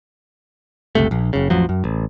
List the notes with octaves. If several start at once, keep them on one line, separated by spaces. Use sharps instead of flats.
G1 C#2 C3 A3
A#1
F#1 C#3
A1 F2 F3 F#3
F#2
A1